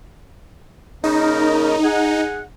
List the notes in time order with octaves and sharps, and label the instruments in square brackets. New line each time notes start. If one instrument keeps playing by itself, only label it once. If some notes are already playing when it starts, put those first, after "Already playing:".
[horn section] C#3 A#3 A#4 [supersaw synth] D#4
[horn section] G#4 F#5